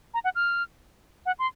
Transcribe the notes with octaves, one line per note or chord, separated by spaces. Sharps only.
A#5
F#5
F6
F#5
C6